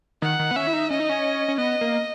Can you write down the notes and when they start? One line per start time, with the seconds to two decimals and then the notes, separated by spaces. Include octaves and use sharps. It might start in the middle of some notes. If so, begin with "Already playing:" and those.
0.22 D#3 F#5
0.39 D#3
0.51 B3
0.56 C#4 E5
0.67 E4
0.73 D#4
0.90 C#4 D#5
1.00 D#4
1.09 C#4
1.48 C#4
1.58 B3 D#5
1.81 A#3